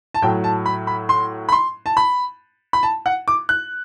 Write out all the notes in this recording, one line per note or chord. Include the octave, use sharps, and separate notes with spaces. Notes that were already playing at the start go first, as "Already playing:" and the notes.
A5
A2 F#3 G5
A5
B5
B5
C6
B5
C6
A5
B5
B5
A5
F#5
D6
F#6